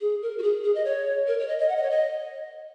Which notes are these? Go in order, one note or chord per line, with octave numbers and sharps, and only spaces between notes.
G#4
A#4
F#4
G#4
G#4
D#5
C#5
A#4
C#5
D#5
D#5
F#5
D#5
C#5
D#5